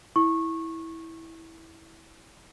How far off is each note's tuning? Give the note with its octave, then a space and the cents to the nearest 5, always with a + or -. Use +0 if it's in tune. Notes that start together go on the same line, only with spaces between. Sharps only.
E4 -15 C#6 -20